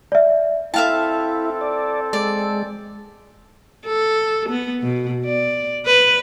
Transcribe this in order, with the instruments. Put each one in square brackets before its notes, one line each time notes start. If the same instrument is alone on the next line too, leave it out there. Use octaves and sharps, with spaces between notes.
[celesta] D5 E5
[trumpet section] C4 A4 [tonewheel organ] E4 [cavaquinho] E5 F5 A5 [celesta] G5
[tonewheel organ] D5
[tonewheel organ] G#3 [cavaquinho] D5
[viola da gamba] A4
B3
B2
D5
B4